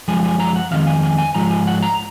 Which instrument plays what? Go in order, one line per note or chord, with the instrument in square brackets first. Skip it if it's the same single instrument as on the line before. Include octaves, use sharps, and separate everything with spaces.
[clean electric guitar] F#2 F3 G#3 G#5
G#5
A#5
F#5
F2 D#3 G#3 F5
G#5
G#5
G#5
G#2 F3 G#3 A#5
G#5
F#5
A#5